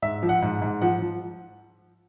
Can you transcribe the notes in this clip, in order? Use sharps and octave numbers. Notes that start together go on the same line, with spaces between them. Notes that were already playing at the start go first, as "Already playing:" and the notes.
G#2 E5
F3
F#5
G#2
G#2
F3 F#5
F3